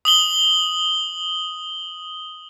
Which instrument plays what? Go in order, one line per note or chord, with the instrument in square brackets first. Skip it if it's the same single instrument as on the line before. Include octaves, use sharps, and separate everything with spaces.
[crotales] D#6 F#7 G7